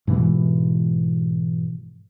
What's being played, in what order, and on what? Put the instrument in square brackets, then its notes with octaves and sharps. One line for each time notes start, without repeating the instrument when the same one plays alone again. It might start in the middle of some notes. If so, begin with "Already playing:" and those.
[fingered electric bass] G#2 B2 E3 G#3